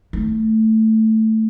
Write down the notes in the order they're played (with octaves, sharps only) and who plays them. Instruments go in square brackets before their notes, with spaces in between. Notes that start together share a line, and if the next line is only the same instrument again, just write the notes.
[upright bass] A3